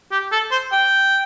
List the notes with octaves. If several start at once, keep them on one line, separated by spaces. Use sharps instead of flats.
G4
A4
C5
G5